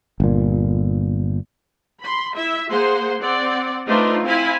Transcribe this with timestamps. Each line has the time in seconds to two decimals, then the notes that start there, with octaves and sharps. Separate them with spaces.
0.20 G1 A#2
2.00 B5 C6
2.35 E4 E5
2.70 A#3 G#4 C5 F#5 C6
3.20 C4 D5 F#5
3.86 A3 D4 D#4 F4 B4 C5
4.25 C4 E4 F5 G#5 B5